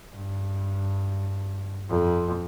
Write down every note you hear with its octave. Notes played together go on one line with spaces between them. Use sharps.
G2
F2